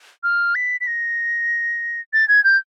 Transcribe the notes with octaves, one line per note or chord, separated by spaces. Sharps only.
F6
B6
B6
A#6
A6
G#6
G6